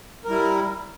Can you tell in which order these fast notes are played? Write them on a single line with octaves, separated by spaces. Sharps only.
A#4 G3 E4